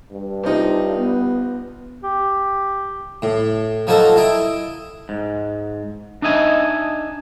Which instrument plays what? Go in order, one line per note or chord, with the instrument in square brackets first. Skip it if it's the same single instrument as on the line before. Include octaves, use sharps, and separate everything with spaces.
[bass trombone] G2
[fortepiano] C3 F3 D#4
[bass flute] B3
[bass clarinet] G4
[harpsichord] A2
F3 F#3 A#3 D#4 A4
E4 D#5 G5
[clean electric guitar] G#2
D4 D#4 D#5 E5 G#5